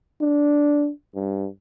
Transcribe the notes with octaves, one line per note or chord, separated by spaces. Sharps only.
D4
G2